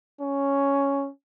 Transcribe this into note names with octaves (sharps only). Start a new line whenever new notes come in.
C#4